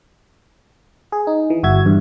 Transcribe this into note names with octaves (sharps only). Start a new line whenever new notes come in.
G#4
D#4
E3
G1 F#4 E5 G#6
E2 G2